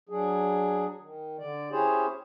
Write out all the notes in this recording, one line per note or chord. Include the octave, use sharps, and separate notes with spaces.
F#3 D4 G#4
D#3
D3 D5
C#4 E4 G4 G#4 C5 C#5